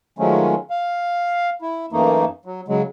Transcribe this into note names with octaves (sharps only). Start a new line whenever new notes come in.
D#3 F3 F#3 G#3 A3 C#4
F5
E4
F#2 E3 A3 A#3 D#4
F#3
C#3 F#3 G#3